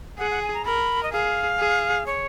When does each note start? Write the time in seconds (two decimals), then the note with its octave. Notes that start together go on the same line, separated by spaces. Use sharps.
0.18 G#4 F#5
0.31 F#5
0.42 G#5
0.54 A#5
0.65 A#4 B5
1.03 D#5
1.12 G#4 F5
1.59 G#4
2.06 C#5